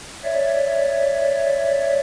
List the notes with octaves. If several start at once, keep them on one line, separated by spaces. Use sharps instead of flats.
C#5 D5 E5